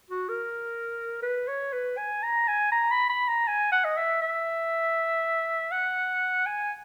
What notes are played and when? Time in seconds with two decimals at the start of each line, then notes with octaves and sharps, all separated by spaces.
0.10 F#4
0.29 A#4
1.22 B4
1.48 C#5
1.73 B4
1.97 G#5
2.23 A#5
2.48 G#5
2.72 A#5
2.91 B5
3.09 B5
3.28 A#5
3.47 G#5
3.72 F#5
3.85 D#5
3.97 E5
4.22 E5
5.72 F#5
6.46 G#5